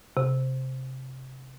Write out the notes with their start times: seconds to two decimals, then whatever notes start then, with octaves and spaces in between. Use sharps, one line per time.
0.17 C3